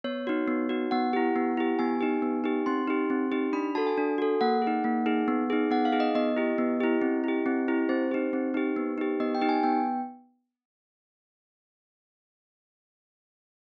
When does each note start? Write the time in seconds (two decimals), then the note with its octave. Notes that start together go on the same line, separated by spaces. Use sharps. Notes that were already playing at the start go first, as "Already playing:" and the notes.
0.04 B3 C#5
0.27 D#4 F#4
0.48 B3
0.69 D#4 F#4
0.91 B3 F#5
1.13 E4 G4
1.36 B3
1.57 E4 G4
1.79 B3 G#5
2.01 D#4 G4
2.22 B3
2.44 D#4 G4
2.66 C4 C6
2.88 D#4 G4
3.10 C4
3.32 D#4 G4
3.53 D4 B5
3.75 F#4 A4 A5
3.87 G#5
3.97 D4
4.18 F#4 A4
4.41 A#3 F#5
4.62 G#4
4.67 D#4
4.84 A#3
5.06 D#4 G#4
5.28 B3
5.50 D#4 G#4
5.71 B3 F#5
5.85 F5
5.93 D#4 G#4
6.00 D#5
6.15 B3 D#5
6.36 E4 G4
6.58 B3
6.80 E4 G4
7.02 C4
7.24 E4 G4
7.46 C4
7.68 E4 G4
7.89 C4 C5
8.11 D#4 G4
8.33 C4
8.54 D#4 G4
8.76 B3
8.98 D#4 G4
9.20 B3 D#5
9.35 G5
9.41 D#4 G4
9.49 G#5
9.63 B3 G5